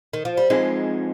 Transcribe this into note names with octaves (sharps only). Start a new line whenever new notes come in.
D#3
F3
G3
F3 G#3 C4 D#4